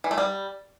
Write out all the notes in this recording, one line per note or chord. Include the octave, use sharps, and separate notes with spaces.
E3
A3
G3